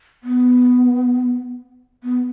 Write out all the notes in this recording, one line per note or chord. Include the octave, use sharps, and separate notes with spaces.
B3
B3